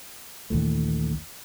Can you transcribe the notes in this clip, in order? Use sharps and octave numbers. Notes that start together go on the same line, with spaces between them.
A#1 D#2 E3 A3